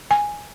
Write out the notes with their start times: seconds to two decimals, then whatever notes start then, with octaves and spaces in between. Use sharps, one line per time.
0.11 G#5